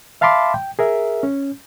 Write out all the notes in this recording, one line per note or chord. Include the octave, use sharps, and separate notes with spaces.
E5 F5 A5 B5 C6 D6
G5
G#4 A#4 E5
C#4